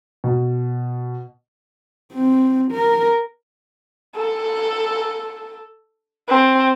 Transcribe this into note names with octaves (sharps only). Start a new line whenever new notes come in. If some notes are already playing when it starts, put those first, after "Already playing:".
B2
C4
A#4
A4
C4